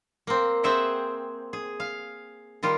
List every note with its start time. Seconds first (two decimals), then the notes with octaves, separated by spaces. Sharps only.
0.27 A#3 C4
0.63 C4 G#4 E5 F#5 G5
1.53 G#4
1.80 F5
2.63 D#3 G3 F4